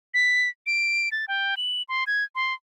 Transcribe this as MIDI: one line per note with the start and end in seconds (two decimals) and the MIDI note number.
0.14 0.49 95
0.67 1.09 98
1.12 1.25 93
1.28 1.55 79
1.57 1.83 102
1.89 2.04 84
2.07 2.24 92
2.35 2.54 84